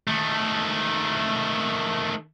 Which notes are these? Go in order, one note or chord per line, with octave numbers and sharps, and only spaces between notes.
D#3 A3